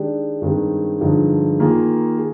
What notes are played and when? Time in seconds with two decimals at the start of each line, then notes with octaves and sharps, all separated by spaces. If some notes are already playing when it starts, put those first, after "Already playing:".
Already playing: D#3 G#3 D4 G4
0.42 G2 D#3 G#3 C4 G4
1.01 G2 D3 F3 G#3 D#4
1.60 D#3 A#3 F4 G#4
2.18 G#4